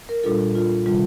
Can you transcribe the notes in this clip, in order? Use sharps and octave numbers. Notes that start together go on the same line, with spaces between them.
A#4
A#2 G3 D4 F4 A4
F4
C3 D#3 G3 F4